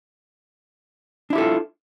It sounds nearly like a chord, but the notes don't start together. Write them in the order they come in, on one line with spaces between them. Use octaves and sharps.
D4 E4 G4 A4 F4